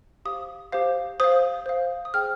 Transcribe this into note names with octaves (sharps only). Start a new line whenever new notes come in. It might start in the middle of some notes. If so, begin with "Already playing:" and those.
G4 C5 F5 D#6
G4 C5 F5
C5 F5 D#6
C5 F5
D#6
G#4 C5 G5 F6